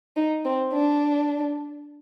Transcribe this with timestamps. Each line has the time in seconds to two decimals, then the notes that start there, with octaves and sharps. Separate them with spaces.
0.16 D#4
0.45 C4
0.73 D4